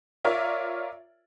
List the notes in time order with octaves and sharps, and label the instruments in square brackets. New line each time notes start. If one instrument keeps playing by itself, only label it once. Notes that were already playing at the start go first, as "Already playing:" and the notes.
[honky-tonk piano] F4 A#4 C#5 D5 E5